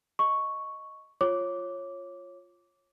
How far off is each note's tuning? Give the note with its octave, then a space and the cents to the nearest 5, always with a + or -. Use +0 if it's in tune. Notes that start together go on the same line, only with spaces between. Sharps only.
D#5 +0 C#6 +0
F4 +0 C#5 -15 D6 -10